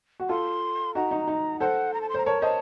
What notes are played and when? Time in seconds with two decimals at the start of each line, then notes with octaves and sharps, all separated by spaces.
0.20 F#4
0.29 F4 A4 C6
0.95 D#4 F#4 A#5
1.11 D#4
1.28 D#4
1.60 A4 C5 F#5
1.94 A#5
2.01 A5
2.09 C6
2.14 C5 A#5
2.26 A#4 C#5 A5
2.42 C5 D#5 A5